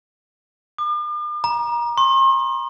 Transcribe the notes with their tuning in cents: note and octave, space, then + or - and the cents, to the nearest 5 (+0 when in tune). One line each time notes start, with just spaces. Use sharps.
D6 +45
A#5 +30
C6 +40